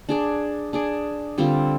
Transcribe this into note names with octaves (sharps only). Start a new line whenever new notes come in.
D4 G#4 D5
D4 G#4 D5
D3 G3 C4 F4